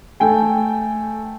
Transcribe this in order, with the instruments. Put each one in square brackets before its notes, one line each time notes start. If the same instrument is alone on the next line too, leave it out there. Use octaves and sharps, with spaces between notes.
[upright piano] A3 G5 G#5